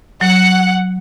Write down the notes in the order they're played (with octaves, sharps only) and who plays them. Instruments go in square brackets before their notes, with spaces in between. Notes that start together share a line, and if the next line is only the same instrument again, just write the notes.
[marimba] F#3 [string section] F#5